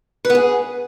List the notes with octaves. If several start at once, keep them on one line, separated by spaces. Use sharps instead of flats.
B4
B3
G#4